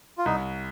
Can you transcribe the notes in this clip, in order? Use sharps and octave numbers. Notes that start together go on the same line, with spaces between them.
F4
C2 D#4